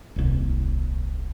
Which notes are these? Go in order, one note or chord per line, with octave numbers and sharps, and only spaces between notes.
D#1 C2